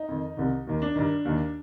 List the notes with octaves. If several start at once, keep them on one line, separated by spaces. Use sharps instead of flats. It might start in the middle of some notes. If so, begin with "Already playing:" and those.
Already playing: D#4
F2 D#3
C2 C3 D#3
D#2 D#3
D4
G2 D#3
D#2 D#3